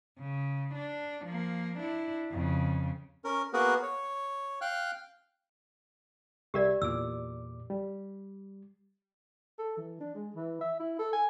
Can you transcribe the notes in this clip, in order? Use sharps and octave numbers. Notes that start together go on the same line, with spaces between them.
C#3
D4
F3 A#3
D4 E4
F2 C#3
C#4 A#4
A#3 B3 F#4 G#4 A#4 B4
C#5
F5 G5 F6 F#6
C2 G3 G4 A#4 D5 E5
E2 A#2 D6 E6
G3
A4
E3
D4
G#3
E3
E5
E4
A4
G#5